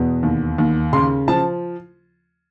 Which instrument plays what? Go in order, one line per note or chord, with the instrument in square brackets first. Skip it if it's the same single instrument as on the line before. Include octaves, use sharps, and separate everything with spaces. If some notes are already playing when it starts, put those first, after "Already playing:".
Already playing: [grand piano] E2 B2
D#2
D#2
C#3 C6
F3 A5